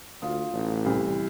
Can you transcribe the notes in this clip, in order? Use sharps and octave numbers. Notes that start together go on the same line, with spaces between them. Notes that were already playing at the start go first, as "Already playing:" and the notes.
D2 F4 D#6
A1
C2 E3